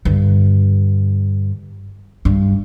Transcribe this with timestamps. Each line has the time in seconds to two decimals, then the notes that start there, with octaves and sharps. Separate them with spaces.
0.05 G2 D3
2.25 G2